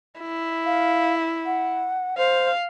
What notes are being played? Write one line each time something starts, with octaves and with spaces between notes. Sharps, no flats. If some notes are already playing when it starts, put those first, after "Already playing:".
E4
F5
F#5
C5 F5